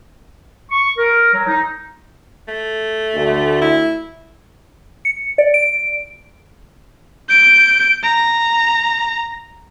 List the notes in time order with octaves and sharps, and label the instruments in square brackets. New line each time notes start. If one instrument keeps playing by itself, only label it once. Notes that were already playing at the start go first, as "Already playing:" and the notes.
[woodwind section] C#6
A#4
F#3
D#4
[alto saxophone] A3
[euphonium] D2
[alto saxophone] E4
[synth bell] C#7
D5
D7
[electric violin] G6 D7
A#5